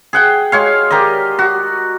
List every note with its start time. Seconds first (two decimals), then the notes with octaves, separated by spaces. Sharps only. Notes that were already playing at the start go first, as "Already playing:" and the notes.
0.13 G#4 F#5 G5
0.52 G#3 C#5 F5
0.91 G4 A#4 D5 D#5
1.39 F#4